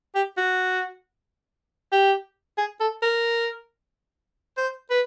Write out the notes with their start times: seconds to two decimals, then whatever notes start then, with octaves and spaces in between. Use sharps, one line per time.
0.15 G4
0.37 F#4
1.92 G4
2.58 G#4
2.80 A4
3.03 A#4
4.57 C5
4.90 B4